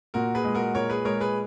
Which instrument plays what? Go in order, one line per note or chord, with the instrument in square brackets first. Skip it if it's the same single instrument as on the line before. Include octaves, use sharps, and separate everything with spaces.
[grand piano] A#2 [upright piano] F#4 A#4
[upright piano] G#4 B4
[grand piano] G#3
[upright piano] F#4 A#4
[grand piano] A#2 [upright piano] A#4 C#5
[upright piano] G#4 B4
[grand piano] G#3 [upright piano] A#4 C#5
[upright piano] G#4 B4